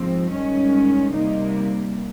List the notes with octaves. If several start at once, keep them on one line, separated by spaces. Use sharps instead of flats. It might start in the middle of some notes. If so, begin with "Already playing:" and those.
Already playing: G#2 F3 C4
G2 D#3 G#3 C#4
C3 G3 A#3 D#4